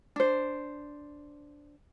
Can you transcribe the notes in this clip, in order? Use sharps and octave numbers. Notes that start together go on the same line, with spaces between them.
D4 C5